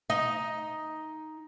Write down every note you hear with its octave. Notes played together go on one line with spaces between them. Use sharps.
D#4 D#5